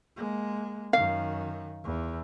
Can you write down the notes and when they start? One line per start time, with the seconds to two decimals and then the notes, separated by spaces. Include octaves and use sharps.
0.17 G#3 A#3
0.93 F#2 D#3 F5
1.84 E2